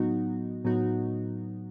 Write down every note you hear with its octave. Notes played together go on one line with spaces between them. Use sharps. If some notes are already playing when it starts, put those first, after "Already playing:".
Already playing: A2 F#3 B3 D#4 F#4
A2 F#3 B3 D#4 F#4